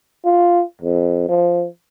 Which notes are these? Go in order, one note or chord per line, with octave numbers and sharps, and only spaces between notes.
F4
F2
F3